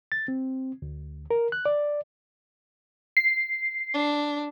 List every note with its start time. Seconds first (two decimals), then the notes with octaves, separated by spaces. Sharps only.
0.12 A6
0.28 C4
0.82 D2
1.31 A#4
1.52 F#6
1.66 D5
3.17 C7
3.94 D4